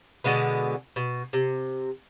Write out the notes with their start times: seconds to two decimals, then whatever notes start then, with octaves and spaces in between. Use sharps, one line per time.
0.24 B2 D3 G#3 B3
0.96 B2
1.33 C3